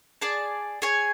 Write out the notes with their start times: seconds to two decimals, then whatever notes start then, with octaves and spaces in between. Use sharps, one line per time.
0.21 G#4 D5 A5
0.82 G#4 C#5 G#5